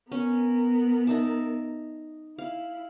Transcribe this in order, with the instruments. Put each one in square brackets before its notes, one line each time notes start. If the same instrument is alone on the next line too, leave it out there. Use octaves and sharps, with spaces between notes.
[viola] B3 A#4 [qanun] C#4
[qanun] D#4 E5 A5
[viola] E4 [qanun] F5